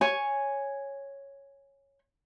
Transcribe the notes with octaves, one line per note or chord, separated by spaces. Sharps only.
C#5 G#5